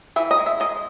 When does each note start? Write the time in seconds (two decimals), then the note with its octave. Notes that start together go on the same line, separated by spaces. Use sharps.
0.16 E3 E5
0.31 D#5
0.38 G#3
0.46 E5
0.60 G#3 D#5